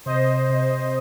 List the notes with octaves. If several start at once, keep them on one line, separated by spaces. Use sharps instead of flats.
C3 C5 D#5
C3